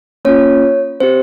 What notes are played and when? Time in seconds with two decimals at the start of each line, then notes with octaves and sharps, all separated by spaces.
0.25 A#3 C#4 F4 C#5
1.00 C4 G4 C5